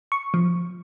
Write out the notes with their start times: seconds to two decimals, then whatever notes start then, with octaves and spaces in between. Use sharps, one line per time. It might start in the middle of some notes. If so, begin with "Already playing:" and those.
0.12 C#6
0.34 F3